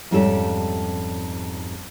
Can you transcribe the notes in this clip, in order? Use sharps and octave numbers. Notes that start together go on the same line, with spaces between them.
F2 G#2 G3 C#4 G4 A4